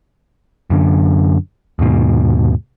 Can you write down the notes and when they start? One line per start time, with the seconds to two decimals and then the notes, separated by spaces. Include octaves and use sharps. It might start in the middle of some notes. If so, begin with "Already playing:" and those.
0.70 F#2 D3
1.79 D#2 G#2 B2